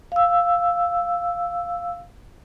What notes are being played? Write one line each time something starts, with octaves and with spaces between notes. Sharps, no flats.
F5 E6